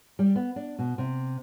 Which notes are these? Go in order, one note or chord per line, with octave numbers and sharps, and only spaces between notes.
G3
B3
D4
B2
C3